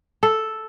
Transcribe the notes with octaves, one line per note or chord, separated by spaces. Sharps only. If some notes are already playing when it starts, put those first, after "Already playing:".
A4